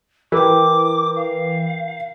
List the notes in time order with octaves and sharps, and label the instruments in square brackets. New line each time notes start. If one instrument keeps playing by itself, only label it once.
[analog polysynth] E3 [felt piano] A#4 G5 [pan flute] D6
[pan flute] F5